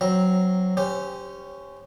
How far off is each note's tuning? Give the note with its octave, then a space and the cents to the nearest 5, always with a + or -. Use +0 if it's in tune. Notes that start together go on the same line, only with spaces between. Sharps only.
F#3 +0 C4 -5 A#5 +0
C#4 +0 G4 +5 C5 -25